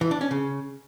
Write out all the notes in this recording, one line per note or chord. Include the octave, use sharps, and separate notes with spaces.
E3
D4
C#4
C#3